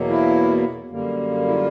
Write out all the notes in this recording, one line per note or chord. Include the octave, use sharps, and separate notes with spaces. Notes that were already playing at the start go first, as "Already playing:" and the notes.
Already playing: E2 B2 F#3 A#3
E4
F#2 D3 G3 A#3
E4
F4